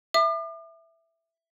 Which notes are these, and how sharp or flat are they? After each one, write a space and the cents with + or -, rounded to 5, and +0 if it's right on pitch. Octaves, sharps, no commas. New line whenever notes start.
E5 +0 D6 +45